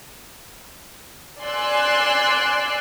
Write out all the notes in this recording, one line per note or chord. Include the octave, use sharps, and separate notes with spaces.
D5 G#5 C6 E6 F#6